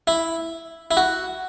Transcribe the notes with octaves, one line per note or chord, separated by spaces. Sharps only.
E4
E4
F#4